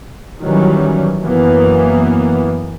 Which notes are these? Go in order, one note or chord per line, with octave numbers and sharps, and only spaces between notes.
D#3 E3 F#3 G3 C#4
F#2 E3 A#3 B3